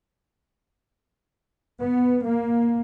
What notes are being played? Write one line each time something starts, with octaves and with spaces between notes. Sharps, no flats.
B3
A#3